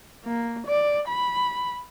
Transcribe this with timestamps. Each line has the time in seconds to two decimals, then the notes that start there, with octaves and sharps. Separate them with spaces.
0.25 A#3
0.67 D5
1.08 B5